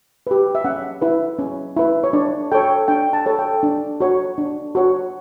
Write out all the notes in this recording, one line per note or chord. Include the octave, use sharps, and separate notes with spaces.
G4 B4
E5
C#4 F#5
E4 B4
C#4
E4 B4
C#5
D4 D5
A4 C#5 G5
D4 G5
A5
A4 C#5
G5
D4
F#4 C#5
D4
F#4 C#5